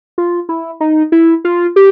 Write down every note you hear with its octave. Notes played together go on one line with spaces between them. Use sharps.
F4
E4
D#4
E4
F4
G4